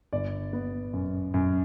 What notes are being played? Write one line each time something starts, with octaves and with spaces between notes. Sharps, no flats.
G1 D5
B3
F#2
F#2